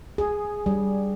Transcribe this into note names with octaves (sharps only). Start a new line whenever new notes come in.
G#4
G3